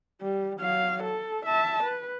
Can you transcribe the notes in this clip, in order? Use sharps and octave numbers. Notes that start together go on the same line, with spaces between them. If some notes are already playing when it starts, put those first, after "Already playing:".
G3
F#3 F5
A4
E5 A5
B4